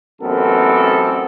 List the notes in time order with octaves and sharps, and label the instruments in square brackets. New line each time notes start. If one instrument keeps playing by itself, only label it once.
[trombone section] A1 F#2 B3 C4 A4 A#4